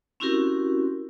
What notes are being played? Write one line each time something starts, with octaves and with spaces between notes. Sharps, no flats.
C4 C#4 E4 F#4 G4 A#4